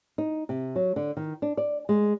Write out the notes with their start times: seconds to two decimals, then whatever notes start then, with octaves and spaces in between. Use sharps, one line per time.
0.18 D#4
0.49 C3
0.76 F#3
0.96 D3
1.17 D#3
1.42 D4
1.57 D5
1.89 G#3